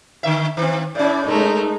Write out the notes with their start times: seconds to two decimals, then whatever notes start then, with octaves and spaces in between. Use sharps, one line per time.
0.23 D3 D#3 E5
0.57 D#3 C4
0.95 A2 C#4 E4 D5
1.26 G#3 A3 D#4 A4 A#4